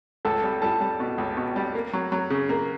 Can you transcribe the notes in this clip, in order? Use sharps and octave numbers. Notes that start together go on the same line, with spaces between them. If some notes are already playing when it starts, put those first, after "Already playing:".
C#2 A4 A5
G3
G3 A4 A5
G3
B2
C#2
B2
G3
A#3
F#3
F#3
C#3
A#3 A#4 A#5